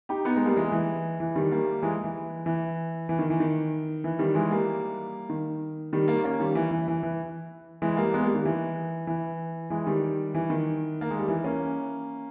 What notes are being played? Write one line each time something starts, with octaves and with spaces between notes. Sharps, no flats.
D#4 G4
B3 D#4
G#3 B3
G3 A#3
E3 G#3
E3
E3
D#3 G3
G3 A#3
E3 G#3
E3
E3
E3
D#3
E3
D#3
E3
D#3 G3
E3 G#3
G3 A#3
D#3
D#3 G3
G3 A#3
A#3 C#4
D#3 G3
E3
E3
E3
E3
E3 G#3
G3 A#3
G#3 B3
G3 A#3
D#3 G3
E3
E3
E3 G#3
D#3 G3
E3
D#3
A#3
G#3
G3
E3
A#3 C#4